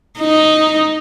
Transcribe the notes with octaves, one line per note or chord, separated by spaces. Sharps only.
D#4